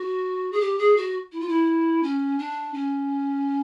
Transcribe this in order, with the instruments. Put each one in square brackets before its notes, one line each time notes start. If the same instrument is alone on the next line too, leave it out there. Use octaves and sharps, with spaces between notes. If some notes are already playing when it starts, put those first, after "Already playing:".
Already playing: [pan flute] F#4
G#4
G4
G#4
F#4
E4
F4
E4
C#4
D4
C#4